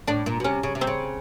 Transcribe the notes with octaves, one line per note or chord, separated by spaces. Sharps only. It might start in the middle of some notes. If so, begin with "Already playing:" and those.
A2 D4 D5
A#2
B2
C3 C#4 C#5
C#3
C3
C4 C5
C#3